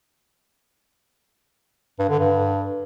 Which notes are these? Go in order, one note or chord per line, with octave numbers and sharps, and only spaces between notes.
G2
D3
G2